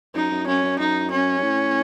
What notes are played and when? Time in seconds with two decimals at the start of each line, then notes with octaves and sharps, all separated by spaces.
0.15 F#2 D#4
0.31 F#2
0.47 F#2 C#4
0.63 F#2
0.79 F#2 D#4
1.11 C#4
1.38 F#2
1.43 A2